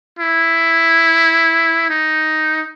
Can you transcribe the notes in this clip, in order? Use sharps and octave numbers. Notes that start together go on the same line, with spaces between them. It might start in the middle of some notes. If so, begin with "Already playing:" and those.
E4
D#4